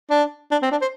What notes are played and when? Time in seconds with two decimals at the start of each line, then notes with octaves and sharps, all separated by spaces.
0.11 D4
0.51 D4
0.62 C4
0.71 D4
0.82 C5